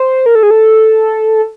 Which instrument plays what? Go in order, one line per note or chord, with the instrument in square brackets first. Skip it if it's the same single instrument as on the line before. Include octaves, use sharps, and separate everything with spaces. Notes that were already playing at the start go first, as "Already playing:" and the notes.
Already playing: [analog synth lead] C5
A#4
A4
G#4
A4